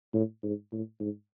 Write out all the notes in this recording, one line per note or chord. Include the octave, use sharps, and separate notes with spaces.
A2
G#2
A2
G#2